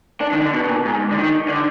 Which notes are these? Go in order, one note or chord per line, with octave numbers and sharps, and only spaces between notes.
D4
D#3
D3
B2
B2
A#2
G#2
D3
D#3
D3